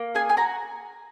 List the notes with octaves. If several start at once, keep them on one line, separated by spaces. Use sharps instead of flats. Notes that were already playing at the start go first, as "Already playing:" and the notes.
Already playing: A#3
G#4 G#5
G#5
F#4 A#5